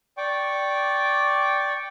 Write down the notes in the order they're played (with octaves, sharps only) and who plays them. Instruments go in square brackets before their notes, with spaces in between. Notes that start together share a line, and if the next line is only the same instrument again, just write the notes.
[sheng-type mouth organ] D5 G5 C#6 D6